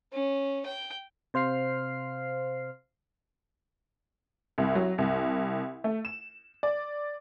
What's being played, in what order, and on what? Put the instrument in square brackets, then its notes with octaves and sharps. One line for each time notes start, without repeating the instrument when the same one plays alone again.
[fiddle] C#4
G5
[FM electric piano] C3 C5 F5 F6 C7
[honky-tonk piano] C2
F#3
C2
A3
E7
D5